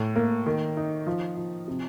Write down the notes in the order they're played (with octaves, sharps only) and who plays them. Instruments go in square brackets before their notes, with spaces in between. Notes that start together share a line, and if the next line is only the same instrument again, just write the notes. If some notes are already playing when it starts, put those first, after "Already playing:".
Already playing: [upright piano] A2
A#3
D#3
D#4
F3
F3
C3